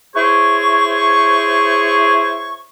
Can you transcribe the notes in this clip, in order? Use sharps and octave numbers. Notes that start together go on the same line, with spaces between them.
E4 G#4 C5 C#5 C#6